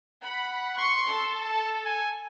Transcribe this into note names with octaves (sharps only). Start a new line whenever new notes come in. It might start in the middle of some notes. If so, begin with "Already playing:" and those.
F#5 B5
C6 C#6 C#7
A4
A5
G#5